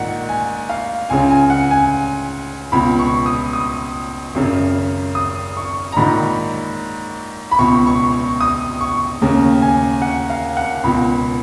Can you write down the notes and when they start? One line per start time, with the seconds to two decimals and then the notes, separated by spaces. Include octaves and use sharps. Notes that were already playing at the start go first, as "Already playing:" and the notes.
Already playing: A#1 G#2 D#3 F#5
0.29 G#5
0.69 F5
1.10 C#2 C#3 G#5
1.31 G#5
1.50 F#5
1.71 G#5
2.72 C#2 B2 B5
2.99 C#6
3.26 D#6
3.53 D#6
4.35 G#1 F#2 C#3
5.15 D#6
5.57 C#6
5.92 A#5
5.97 A#1 G#2 D#3 B5
7.51 B5
7.59 C#2 B2 C#6
7.87 C#6
8.13 C#6
8.41 D#6
8.81 C#6
9.22 D#2 C#3
9.62 G#5
10.02 F#5
10.30 F5
10.57 F#5
10.84 C#2 B2 B5